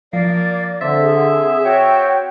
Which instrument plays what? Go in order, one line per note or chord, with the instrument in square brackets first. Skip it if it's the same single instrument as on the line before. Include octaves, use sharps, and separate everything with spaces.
[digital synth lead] F3 [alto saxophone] A#3 [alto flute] D5
[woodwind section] D3 [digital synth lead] C4 [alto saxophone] E5
[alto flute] G#4
[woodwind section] F#4 C#5 [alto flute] G5